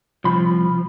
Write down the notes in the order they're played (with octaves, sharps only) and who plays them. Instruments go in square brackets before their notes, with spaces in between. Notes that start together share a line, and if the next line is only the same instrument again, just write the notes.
[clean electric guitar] C2 B5 [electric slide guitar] F3